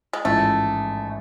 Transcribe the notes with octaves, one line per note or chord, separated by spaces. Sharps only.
G#3
A1 G#2 F3 A3